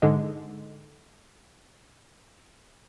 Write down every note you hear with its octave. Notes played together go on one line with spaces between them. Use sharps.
G#2 D3 G#3